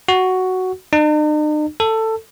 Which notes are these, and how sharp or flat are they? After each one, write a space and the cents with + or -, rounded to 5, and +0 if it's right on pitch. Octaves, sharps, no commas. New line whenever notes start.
F#4 +5
D#4 -45
A4 +15